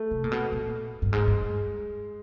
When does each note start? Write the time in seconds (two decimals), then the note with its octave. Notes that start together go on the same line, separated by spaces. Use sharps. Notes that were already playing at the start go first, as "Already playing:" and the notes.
Already playing: A3
0.11 C3
0.24 A#2
0.31 B2
0.52 A#2
1.02 G2
1.12 G#2 G#3
1.27 G2